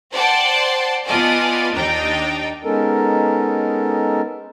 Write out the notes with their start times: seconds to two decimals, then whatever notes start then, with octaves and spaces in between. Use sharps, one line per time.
0.12 C5 D5 F#5 G5 A5 C6
1.05 B3 F4 D5 D#5 G#5 A5
1.74 D#2 D4 D#4 G5
2.63 G#3 B3 C#4 D#4 A4 A#4